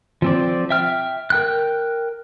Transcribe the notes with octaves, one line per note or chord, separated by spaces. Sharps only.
F3 C4 D5
E5 G5 F6
A#4 G5 F#6